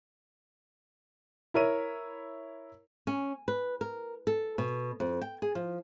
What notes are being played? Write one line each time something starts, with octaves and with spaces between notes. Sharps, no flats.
E4 A#4 C#5 D#7
C#4
B4
A#4
A4
B2
F2
G5
G#4
F3